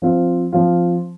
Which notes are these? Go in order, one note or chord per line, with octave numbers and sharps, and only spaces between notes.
F3 C4 F4
F3 C4 F4